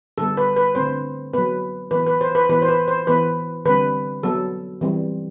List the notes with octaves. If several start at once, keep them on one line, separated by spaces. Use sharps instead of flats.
D3 G3 B3 A4
B4
B4
D3 A3 C4 C5
F#3 B3 B4
E3 B3 B4
B4
C5
B4
E3 B3 B4
C5
B4
C5
E3 B3 B4
D3 G3 C4 B4
F#3 B3 A4
E3 G3 C4